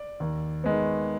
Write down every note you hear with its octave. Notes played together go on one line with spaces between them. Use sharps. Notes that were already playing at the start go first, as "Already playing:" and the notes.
Already playing: D5
D#2
D#3 G#3 B3